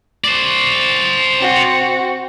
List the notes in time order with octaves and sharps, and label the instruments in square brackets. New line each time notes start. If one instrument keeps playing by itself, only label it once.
[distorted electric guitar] C5 D5
[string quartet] C4 F#4